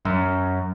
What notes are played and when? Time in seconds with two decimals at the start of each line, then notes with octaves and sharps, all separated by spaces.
0.05 F#2